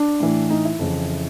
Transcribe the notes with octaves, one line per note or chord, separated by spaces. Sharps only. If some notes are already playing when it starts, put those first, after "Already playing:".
Already playing: D4
A2 E3
D#4
E4
F2 C#3 E3